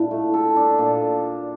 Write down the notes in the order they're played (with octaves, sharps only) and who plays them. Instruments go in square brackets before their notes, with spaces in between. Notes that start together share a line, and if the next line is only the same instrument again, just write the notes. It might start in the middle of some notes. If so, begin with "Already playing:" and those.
Already playing: [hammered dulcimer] A#2 D4 [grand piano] E4
[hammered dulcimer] A3
A4
D4
A#2